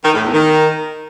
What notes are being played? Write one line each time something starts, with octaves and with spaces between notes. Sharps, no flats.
D#3
A2
E2
D#3